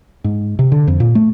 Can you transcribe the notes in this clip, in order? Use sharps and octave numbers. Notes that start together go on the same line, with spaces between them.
G#2
C3
D3
F2
A#2
A3